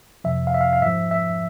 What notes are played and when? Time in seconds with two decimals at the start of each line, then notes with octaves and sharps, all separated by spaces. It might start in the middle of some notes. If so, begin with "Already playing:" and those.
0.24 F2 C3 F3 E5
0.47 F5
0.54 E5
0.61 F5
0.73 F5
0.82 G#2 F3 E5
1.11 E5